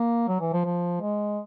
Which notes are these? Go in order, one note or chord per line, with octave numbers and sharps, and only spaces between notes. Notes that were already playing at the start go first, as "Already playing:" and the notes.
Already playing: A#3
F#3
E3
F3
F3
G#3